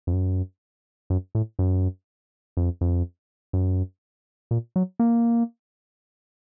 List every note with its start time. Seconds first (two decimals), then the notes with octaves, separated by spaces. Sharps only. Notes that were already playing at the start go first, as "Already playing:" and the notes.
0.07 F2
0.13 F#2
1.10 F#2
1.35 A2
1.59 F#2
2.57 F2
2.81 F2
3.53 F#2
4.51 A#2
4.76 F#3
5.00 A#3